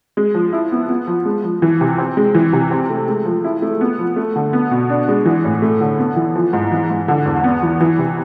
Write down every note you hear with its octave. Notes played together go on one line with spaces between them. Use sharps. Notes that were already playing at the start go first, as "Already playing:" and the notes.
G#3
F3
E4
B3
B3
F3
G#3
F3
E3
C3
C4
G#3
E3
C3
C4
A3
G#3
F3
E4
A3
B3
F3
A3
D3
B3
B2
D4
G#3
E3
A2
A3
D3
B3
E3
F3
G#2
E3
G#2
D3
E2
B3
E3
E3
C3